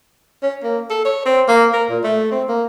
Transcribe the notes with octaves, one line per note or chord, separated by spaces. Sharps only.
C#4
A#3
A4
C#5
C4
A#3
A#4
A#2
A3
C4
A#3